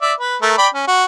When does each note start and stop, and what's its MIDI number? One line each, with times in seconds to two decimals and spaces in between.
0.02 0.13 74
0.02 0.13 76
0.20 0.37 71
0.42 0.57 57
0.42 0.57 70
0.58 0.68 74
0.58 0.68 79
0.58 0.68 83
0.74 0.86 61
0.88 1.05 66